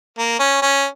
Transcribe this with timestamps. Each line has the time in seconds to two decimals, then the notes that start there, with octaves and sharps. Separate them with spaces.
0.18 A#3
0.40 C#4
0.62 C#4